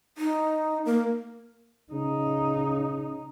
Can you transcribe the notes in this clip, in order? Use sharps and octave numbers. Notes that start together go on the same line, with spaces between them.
D#4
A#3
C#3 D#4